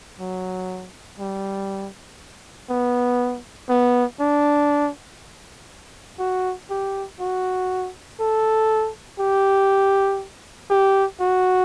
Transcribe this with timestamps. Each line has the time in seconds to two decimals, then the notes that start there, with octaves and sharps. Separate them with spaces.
0.20 F#3
1.19 G3
2.70 B3
3.69 B3
4.20 D4
6.19 F#4
6.70 G4
7.20 F#4
8.20 A4
9.20 G4
10.70 G4
11.21 F#4